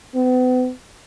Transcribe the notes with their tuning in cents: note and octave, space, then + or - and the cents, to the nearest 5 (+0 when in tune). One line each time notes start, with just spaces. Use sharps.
B3 +40